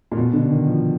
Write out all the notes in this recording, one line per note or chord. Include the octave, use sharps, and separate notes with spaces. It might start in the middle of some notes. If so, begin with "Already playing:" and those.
A#2
B2
D3
D#3
F3